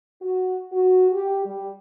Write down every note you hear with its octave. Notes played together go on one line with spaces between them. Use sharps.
F#4
F#4
G4
G3